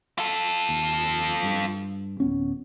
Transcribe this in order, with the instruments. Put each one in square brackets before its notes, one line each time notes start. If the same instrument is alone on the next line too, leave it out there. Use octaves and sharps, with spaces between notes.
[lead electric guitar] F4 A4
[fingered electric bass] D#2
G2
D1 B3 C#4